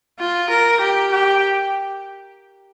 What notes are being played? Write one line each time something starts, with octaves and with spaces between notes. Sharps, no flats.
F4
A#4
G4
G4